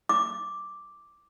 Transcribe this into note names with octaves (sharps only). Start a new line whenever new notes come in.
D6